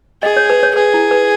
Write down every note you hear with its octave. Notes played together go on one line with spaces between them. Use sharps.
G#4 D#5
C#5
B4
C#5
G#4 B4
E4
B4